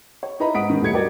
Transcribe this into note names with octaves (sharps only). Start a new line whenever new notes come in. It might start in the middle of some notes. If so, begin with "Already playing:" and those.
C#5
D#4 E4 B4 D#5 A#5 B5
G#2 F#5 D#6 B6 D7
D#3
D#1 G3 A3 G#6 C#7
F#4 G4 A#4 B4 D5 D#5